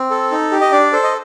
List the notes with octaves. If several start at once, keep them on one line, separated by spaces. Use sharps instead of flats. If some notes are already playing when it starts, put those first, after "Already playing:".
Already playing: C4
A4
D#4
G4
D#5
D4 D5
A4 C5
D#5